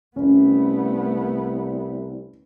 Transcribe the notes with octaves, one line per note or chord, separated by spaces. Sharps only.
C2 A3 B3 C#4